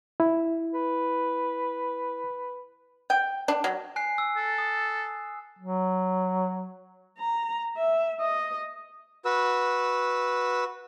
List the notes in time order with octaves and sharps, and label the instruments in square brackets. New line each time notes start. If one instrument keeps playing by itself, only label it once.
[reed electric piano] E4
[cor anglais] B4
[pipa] G5
D4
F#3
[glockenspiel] G#5 F#6 C7
E6
[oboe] A4
[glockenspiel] D#6
[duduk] F#3
[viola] A#5
E5
D#5
[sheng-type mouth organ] F#4 B4 E6